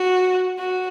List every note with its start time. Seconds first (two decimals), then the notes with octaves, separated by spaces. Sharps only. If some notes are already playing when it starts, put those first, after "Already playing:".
Already playing: F#4
0.58 F#4